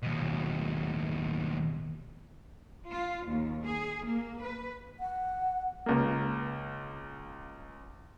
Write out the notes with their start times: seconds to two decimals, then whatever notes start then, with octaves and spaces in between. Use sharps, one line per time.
0.03 D#2 B2
2.89 F4
3.27 D#2
3.64 G#4
4.05 A#3
4.41 B4
5.00 F#5
5.86 C#2 A#3